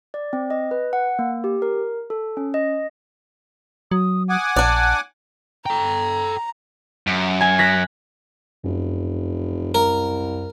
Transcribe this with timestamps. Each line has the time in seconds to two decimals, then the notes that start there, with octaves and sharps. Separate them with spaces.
0.14 D5
0.33 C4
0.50 D#5
0.71 B4
0.93 F#5
1.19 A#3
1.44 G4
1.62 A#4
2.10 A4
2.37 C#4
2.54 D#5
3.91 F#3 D#6
4.29 F#5 G#5 D6 D#6
4.56 A#1 D4 D5 F#6
5.66 A4 G5 A#5
7.07 F#2
7.41 G#5
7.59 F#6 A#6 B6
8.64 F1 F#2
9.75 C2 A#4